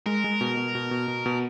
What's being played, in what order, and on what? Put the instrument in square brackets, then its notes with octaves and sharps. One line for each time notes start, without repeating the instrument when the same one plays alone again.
[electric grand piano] G#3 [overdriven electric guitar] A#4
[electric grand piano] G#3
B2
B2
B2
B2
B2
B2